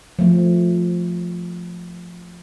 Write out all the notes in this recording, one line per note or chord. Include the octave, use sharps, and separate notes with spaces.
F3 A3